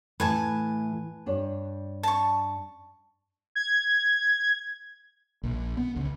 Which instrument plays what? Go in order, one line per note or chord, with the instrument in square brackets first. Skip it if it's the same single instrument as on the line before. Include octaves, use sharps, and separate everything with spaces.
[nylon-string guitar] A2 E3 A3 [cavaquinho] B4 G#5 A5
[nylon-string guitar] G2 D4 C#5
[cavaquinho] A5 C#6
[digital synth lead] G#6
[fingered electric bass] A#1
B3
C#2